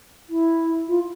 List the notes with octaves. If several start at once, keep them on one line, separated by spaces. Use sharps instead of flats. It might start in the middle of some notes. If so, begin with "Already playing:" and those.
E4
F4